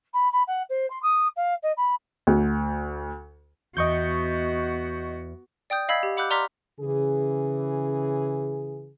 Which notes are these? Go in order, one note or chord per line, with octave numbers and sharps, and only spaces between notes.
B5
B5
F#5
C5
C6
D#6
F5
D#5
B5
D2
E2 B3 F#4 D#5 G5 C#6 G6
D5 G5 D#6 G6
D#5 F5 B5 E6 G#6 B6
G4
F#5 B5 D6 E6 F#6 G6
D5 A#5 C6 D6 F6 B6
C#3 E3 G#4